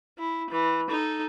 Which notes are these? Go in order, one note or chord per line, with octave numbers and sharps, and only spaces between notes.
E4
E3
D#4 A4